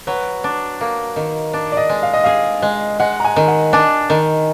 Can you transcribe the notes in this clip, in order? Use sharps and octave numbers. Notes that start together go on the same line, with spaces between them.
F#3 B4
D4
A#3
D#3
D4
D5
D#5
G#3
F5
D#5
G#4 F5
G#3
G#3 F#5
A#5
G#5
D#3
F#5
D4 G#5
D#3